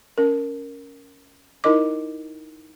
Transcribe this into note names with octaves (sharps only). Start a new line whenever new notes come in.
C#4 A#4
D#4 E4 A#4 D#5 D6